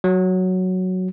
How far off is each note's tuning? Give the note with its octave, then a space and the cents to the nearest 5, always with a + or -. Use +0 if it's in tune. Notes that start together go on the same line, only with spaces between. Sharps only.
F#3 +0